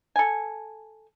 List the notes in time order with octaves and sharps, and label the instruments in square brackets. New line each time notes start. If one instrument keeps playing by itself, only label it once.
[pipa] A4 G#5